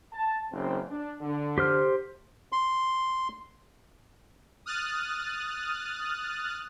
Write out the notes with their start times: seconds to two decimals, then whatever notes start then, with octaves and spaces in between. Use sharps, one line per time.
0.13 A5
0.52 F#1 E2 C4
0.89 D4
1.21 D3
1.58 G4 C5 F6
2.52 C6
4.66 D#6 F6 F#6 A6